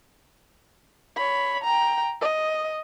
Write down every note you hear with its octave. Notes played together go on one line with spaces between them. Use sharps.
C#5 B5
G5 A#5
D#5